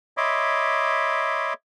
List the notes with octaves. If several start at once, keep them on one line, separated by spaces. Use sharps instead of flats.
C#5 D#5 E5 B5 C6 D6